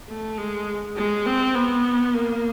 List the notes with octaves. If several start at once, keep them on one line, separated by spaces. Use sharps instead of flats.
A3
G#3
G#3
C4
B3
A#3